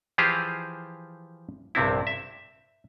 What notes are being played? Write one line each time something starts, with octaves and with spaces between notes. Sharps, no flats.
E3 F3 F4 G4 G#4 C5
A#1 G2 C3 C4 E4
E5